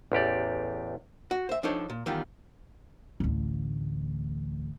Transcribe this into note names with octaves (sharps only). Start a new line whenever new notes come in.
A1 E2 G4 D5
F#4
C5 E5
F3 D4 D#4 A4 C5 C#5
A#2
E2 D#3 G3 F4
A1 D2